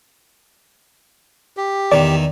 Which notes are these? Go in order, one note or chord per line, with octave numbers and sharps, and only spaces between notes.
G4
E2 D#3 D5